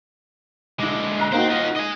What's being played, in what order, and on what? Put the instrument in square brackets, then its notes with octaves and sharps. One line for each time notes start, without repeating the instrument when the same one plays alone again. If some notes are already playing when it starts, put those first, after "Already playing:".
[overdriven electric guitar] D3 G#3 [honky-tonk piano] E4 D6
[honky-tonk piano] A#5 F#6 C7
[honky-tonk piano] A#3 D#4 F#4 [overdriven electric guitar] C5 G5
[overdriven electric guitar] F4 D#5
D#5 G#5